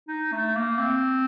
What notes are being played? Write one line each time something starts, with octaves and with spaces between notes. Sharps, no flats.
D#4
A3
A#3
C4